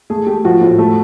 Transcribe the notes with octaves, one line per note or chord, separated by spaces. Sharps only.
A3 G#4
A3 G4
F3 F#4
A2
A3